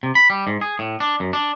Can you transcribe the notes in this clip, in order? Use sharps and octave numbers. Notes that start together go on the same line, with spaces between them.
C3
B5
G3
G#2
G#4
A2
D4
F#2
D4